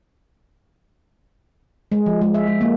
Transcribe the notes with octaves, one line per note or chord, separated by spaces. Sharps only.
G#3
F3
G#3
E5
G#3
A#3